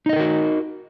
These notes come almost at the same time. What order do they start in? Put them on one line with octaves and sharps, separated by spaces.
D#4 D#5 A4 A#4 F#4